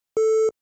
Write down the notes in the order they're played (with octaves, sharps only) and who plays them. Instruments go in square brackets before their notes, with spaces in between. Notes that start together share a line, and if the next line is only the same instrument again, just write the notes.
[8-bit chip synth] A4